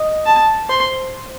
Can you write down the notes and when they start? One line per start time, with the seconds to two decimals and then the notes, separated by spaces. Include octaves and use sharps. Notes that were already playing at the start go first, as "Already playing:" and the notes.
Already playing: D#5
0.26 A5
0.69 C5 C6